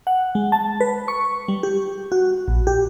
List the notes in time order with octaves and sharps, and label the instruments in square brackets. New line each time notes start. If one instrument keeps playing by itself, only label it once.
[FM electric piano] F#5
G#3
A5
B4
C#6
G3
G4
F#4
A#1
G4